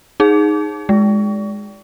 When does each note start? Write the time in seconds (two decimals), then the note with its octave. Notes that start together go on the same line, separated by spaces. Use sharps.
0.20 D#4 G#4
0.89 G#3